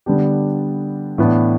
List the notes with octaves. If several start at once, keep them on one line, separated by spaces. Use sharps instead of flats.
D3 G3 B3 D4 G4
A2 E3 B3 D4